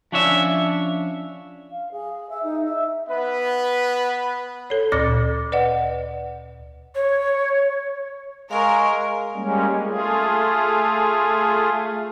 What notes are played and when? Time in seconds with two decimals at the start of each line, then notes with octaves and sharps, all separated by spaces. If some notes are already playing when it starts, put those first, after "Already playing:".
0.12 F3 C#4 D4 C#5 E5
1.71 F5
1.91 G#4
2.29 E5
2.43 D#4
2.64 E5
3.09 B3 B4
4.70 A4 C#5
4.92 D2 A#2 D6 A6 A#6
5.52 B4 D5 D#5 F#5
6.95 C#5
8.51 G#3 A#4 F5 C#6
9.35 G3 G#3 A#3 C#4
9.86 A3 F4 G#4